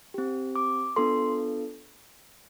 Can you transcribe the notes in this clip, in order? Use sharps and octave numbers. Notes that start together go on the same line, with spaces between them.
C4 G4
D6
B3 D4 F4 A4 C6